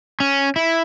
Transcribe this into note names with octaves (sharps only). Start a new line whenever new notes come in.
C#4
E4